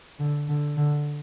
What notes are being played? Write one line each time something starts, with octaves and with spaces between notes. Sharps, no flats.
D3
D3
D3